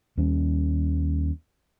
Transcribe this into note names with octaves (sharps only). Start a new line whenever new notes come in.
D#2 G3 C#4